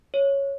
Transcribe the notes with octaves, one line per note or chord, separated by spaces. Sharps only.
C#5